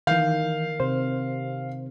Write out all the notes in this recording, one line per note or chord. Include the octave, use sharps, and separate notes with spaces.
D#3 E3 F5 G6
C3 C5